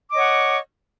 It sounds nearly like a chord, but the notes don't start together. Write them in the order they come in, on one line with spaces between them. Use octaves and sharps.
D6 D#5 C#5 F#5